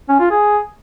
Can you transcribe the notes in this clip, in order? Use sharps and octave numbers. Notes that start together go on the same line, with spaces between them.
C#4
F4
G#4